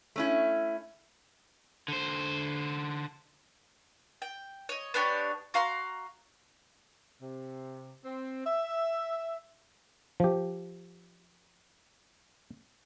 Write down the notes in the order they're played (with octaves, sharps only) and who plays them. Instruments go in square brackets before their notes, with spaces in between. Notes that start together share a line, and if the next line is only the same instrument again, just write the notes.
[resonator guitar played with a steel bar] A3 C#4 E4
[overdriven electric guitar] D3 C5
[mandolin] G5
C#5 D#5
B3 D4 G4 C#5
F#4 F5 A#5 C6
[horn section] C3
C4
E5
[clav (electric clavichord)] F3 G4